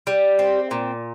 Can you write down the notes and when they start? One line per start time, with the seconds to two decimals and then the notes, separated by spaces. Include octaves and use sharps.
0.07 G3
0.39 C4
0.71 A#2